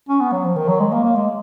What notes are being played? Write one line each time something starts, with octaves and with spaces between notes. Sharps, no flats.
C#4
B3
F#3
F3
D#3
F#3
G#3
A#3
A#3
G#3